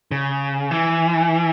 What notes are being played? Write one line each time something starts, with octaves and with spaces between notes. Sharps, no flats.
C#3
E3